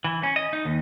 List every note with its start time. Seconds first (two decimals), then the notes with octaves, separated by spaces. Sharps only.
0.04 E3
0.23 C#4
0.36 D#5
0.53 D#4
0.65 D#2